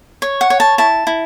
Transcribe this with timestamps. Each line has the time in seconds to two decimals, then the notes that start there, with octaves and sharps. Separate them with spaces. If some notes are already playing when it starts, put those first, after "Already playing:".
0.22 C#5
0.41 F#5
0.50 C#5
0.60 A5
0.78 E4 A5
1.07 E4